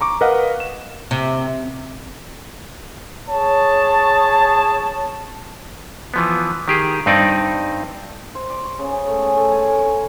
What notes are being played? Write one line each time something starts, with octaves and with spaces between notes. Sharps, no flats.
A#5 C#6 D6
A#4 B4 D#5 F5 F#5
E7
C3
G#4 C#5 A5
E3 F3 B3
D#3 G4 G#4
G2 C4 D#4 D5
C5
D5
C#6
C#3
G#4
A3
G#4
A3
G#5
A#4
C#5
A#5